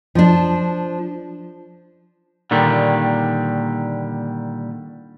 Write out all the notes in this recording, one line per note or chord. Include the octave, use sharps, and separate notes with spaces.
F3 D4
A#2 D3 D#3 G3